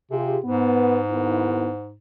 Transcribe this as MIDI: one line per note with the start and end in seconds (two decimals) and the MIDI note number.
0.11 0.38 48
0.11 0.35 65
0.11 0.35 67
0.11 0.35 68
0.44 1.96 44
0.44 0.97 59
1.10 1.66 39
1.10 1.66 59
1.10 1.66 64